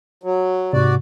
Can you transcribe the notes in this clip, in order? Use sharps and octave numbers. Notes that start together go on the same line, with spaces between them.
F#3
G#2 C3 F#4 D5